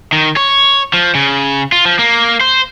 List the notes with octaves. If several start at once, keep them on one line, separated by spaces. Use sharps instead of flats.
D#3
C#5
F3
C#3
F4
F3
A#3
C5